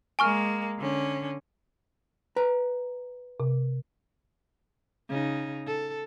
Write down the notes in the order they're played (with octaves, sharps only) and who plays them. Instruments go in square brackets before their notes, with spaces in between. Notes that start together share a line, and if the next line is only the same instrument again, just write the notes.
[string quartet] G#3 A#3 [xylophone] G#5 C#6 F6
[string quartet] D3 C#4
[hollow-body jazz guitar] B4 A#5
[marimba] C3
[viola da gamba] C#3 D#4
A4